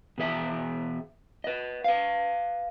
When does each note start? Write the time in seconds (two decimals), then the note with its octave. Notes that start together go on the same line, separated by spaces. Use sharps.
0.18 B2 E3 G#4 E5
1.44 B4 D#5
1.84 B4 F5